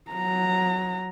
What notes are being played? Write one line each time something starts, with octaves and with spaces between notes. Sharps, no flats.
F#3 A#5